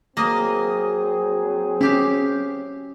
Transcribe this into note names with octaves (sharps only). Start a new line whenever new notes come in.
F#3 A#3 C4 G#4 D#5
C#4 E4 G4 F5